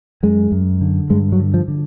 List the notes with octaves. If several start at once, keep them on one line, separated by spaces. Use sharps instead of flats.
F#2 G#3
F#2
D3
G2 G#3
F#3
D3
F3
D3